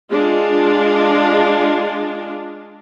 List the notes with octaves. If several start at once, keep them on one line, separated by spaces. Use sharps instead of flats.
G#3 D4 F4